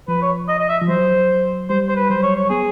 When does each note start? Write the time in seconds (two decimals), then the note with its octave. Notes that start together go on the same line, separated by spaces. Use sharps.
0.08 F3 B4
0.22 C#5
0.48 D#5
0.59 D#5
0.69 E5
0.82 F3
0.88 F#3 C5
1.69 G3 C5
1.89 C5
1.96 B4
2.09 F#3 C5
2.23 C#5
2.36 C#5
2.50 B3 G#4